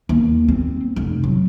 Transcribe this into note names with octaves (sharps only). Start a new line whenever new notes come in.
D#2
C4
F1
F#3